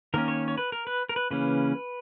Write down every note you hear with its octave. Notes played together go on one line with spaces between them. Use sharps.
D#3 A#3 C#4 A#4
C#5
C#5
B4
A#4
B4
A#4
B4
C#3 E3 A#3 C#4 B4